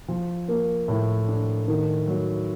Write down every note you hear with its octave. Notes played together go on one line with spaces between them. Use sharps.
F3
A#3
A2
D4
D#3
F#3